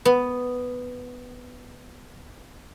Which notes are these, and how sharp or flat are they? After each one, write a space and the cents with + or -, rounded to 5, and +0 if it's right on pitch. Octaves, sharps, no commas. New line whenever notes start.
B3 +5